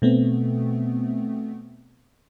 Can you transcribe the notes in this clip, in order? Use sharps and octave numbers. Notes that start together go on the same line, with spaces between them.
B2 A3 B3 C4